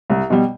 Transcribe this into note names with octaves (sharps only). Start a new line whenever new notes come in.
C2
B2 G3